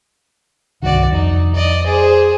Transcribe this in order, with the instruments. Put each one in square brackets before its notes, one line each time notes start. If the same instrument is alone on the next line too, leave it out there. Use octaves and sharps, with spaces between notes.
[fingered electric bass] C2 G2 D#3 [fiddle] F#4 D5
[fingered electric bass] F2 [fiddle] D#4
[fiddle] D5 D#5
G#4 C5